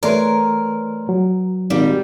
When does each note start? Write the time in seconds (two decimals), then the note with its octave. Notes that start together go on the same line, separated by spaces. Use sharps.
0.03 E3 A3 A#4 B4 C#5 D5 C6
1.09 F#3
1.70 G#1 A#2 G3